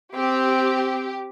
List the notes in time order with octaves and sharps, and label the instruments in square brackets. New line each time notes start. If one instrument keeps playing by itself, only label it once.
[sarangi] C4 [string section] G4